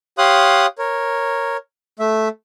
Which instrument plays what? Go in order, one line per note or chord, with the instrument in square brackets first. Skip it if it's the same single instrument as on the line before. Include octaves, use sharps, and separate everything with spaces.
[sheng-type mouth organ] G4 C#5 F5 C6 D#6 F#6
A#4 C#5
A3 E5